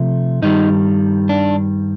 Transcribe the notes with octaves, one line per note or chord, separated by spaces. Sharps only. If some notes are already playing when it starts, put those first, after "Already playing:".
Already playing: C3 F3 A3 C4
G2 D#3 G3 D#4
D4